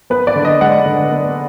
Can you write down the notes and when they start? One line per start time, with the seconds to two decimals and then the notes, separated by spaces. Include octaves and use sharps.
0.10 B3 B4
0.27 D5
0.36 D3
0.45 D#5
0.61 G#3 F#5
0.86 D3
1.12 B3